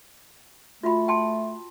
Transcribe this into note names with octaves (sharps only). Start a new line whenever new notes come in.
A3 F4 F#4 B5
G5 A5 C6